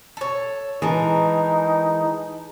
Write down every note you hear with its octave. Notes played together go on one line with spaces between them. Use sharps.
A4 C#5
E3 G#3 D#4 G#4 A#4 A5 A#5